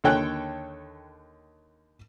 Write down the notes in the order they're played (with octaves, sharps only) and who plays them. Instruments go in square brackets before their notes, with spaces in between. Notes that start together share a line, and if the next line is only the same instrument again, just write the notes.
[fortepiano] D#2 D3 A4 C#5 G5 F#6